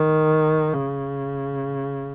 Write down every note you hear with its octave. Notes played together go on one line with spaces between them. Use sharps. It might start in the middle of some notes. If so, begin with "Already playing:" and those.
Already playing: D#3
C#3